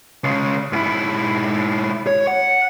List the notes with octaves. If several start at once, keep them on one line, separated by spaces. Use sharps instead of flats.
C#2 C#3
G#2 E4
C#5
F#5